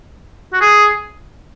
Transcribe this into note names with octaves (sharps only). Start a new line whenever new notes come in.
F#4
G#4